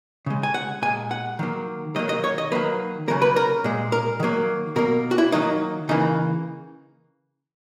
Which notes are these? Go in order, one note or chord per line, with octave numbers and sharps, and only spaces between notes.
C#3 G#3
G#5
F#5
A#2 G#3 G#5
F#5
D#3 F#3 A#3
D#3 F#3 A#3 D#5
D#5
C#5
D#5
D#3 F#3 A#3 B4
C#3 F#3 A#3 A#4
B4
A#4
A#2 G#3
A#4
D#3 F#3 A#3
B2 A#3 A#4
F#4
E4
D#3 F#3 A#3 D#4
C#3 E3 A#3 D#4